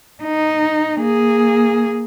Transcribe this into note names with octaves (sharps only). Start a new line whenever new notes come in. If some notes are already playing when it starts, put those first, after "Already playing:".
D#4
A#3 G#4